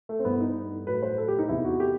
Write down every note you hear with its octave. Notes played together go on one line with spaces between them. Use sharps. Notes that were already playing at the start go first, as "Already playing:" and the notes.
A3
C4
G2 E3 B3
D#4
A2 F#3 B4
C5
A4
G4
D#4
E2 C3 E3 E4
F#4
G4